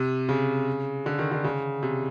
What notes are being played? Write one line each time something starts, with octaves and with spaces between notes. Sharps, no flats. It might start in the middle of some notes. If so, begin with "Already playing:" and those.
Already playing: C3
C#3
D3
D#3
D3
C#3
C3